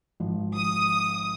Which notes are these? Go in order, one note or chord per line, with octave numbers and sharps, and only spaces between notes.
G#1 F3
D#6